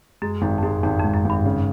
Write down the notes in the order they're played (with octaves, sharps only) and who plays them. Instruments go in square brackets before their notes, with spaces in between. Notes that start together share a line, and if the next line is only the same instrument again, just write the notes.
[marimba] F#2 [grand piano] G#3
[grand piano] G#1 [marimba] F#2
[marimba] F2
[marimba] F#2 [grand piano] G#3
[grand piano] G#1 [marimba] F2
[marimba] F2
[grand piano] G#2
[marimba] F#2
[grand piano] G#1 [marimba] G2
[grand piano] C#3